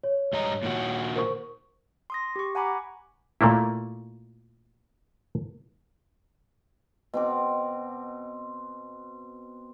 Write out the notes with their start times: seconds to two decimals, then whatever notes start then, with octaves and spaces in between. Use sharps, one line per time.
0.04 C#5
0.33 G2 D#5 A#5
0.63 A#2 D#3 F#4
1.16 A#4 C5 C#6
2.10 C6 D#6 A#6
2.36 G4 C#6
2.55 F#5 G#5 A#5 B5 D6
3.41 A#2 A3 A#3 E4
7.14 B2 C4 D6